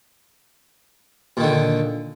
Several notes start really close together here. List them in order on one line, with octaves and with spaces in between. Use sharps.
A#2 D#3 D3